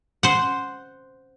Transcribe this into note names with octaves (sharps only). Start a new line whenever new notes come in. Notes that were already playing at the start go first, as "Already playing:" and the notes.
C5 F#5